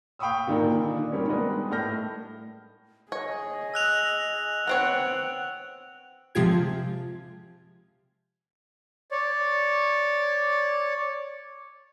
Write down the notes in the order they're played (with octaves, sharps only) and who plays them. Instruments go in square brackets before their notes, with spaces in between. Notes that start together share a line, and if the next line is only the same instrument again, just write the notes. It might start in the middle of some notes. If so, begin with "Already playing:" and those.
[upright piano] F5 G5 B5 C#6 D#6 E6
A#2 D3 D#3 D4 F4 A#4
D4
D#3 G3 A#3 C4 C#4
G3 G#3 B3 D4 A#4 D#5
A2 A4 F6 G6 A#6
[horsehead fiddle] G#4 [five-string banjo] C#5 [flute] D#5
[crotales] E6 F#6 F7
[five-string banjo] B3 C4 C#5 [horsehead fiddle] F#5 [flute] G5
[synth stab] C3 F3 G#3 F4 G4 G#6
[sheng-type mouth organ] C#5 D5